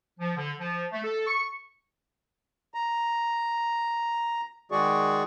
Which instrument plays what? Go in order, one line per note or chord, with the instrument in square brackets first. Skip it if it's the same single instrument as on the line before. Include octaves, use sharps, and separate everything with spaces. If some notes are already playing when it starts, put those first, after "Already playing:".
[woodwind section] F3
D3
F3
A3
A4
C#6
[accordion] A#5
D#3 G#3 F#4 G#4 D5 C#6